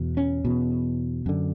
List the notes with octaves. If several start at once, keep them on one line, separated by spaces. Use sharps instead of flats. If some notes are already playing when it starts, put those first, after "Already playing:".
Already playing: E2 B2
C#4
E2 B2
F#2 D3